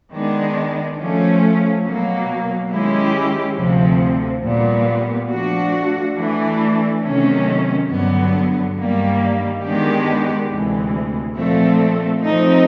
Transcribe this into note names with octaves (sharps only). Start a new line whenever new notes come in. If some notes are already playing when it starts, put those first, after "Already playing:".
D#3 G#3 B3 D4
F3 A3 C#4
B2 F#3 A#3
D#3 G#3 C#4 E4 G4
D2 C3 F3
A#2 G3 B3
F3 A3 D4 F#4
E3 A3 D4
C3 D#3 F#3 A3 C#4
G2 D3 F#3 B3
G2 D#3 G3 A#3
D#3 G#3 B3 D4 G4
D2 C3 E3 G#3
A#2 F3 A3 C4
F3 A3 C4 D#4